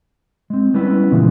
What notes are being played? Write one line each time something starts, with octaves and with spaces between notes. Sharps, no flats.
G#3 C4
G3 B3 C#4 E4 B4
A#2 C#3 E3 F3 G#3